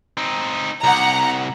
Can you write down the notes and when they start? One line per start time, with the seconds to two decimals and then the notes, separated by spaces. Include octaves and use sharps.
0.17 C4 D#4
0.84 C2 F#5 A#5